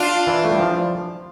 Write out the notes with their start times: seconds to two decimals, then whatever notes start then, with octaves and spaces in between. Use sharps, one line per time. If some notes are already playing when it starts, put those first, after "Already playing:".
Already playing: D4 F4
0.27 E3
0.44 A3
0.52 G3
0.60 F3